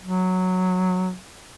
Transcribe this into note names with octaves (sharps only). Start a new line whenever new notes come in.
F#3